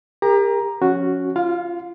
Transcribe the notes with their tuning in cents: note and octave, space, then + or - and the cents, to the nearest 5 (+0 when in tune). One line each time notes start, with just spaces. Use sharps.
G4 +40 A#4 +0 A#5 +10
F3 +20 C#4 +0 F#4 +0
F4 -20 F5 +20